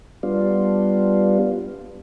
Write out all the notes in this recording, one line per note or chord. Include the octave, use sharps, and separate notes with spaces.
G3 B3 D4 F4